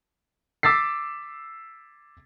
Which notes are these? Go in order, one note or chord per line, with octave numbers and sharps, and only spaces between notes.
D6 E6 A6 B6 C7